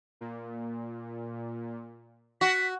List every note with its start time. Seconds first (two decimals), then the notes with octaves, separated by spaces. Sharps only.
0.21 A#2
2.41 F#4 B6